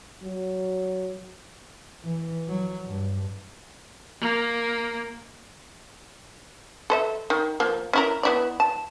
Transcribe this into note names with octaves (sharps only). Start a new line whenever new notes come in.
F#3
E3
F#3
G2
A#3
A4 C5 E5
D#3
F3 A#3
C#4 E4 A#4
B3 E4 D5
A5